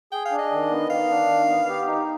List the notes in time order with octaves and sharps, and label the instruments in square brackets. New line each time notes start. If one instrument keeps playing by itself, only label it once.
[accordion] G#4 [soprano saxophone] G5
[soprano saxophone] F5
[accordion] D4
[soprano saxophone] D#5
[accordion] D#3
B3
[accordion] D#3 [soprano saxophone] F5
[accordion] D4
D#3
B3
G4
D#4